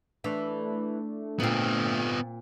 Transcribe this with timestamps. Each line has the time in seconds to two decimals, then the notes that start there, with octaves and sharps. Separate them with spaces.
0.24 E3 A3 D4
1.40 A#2 B3 C4 F4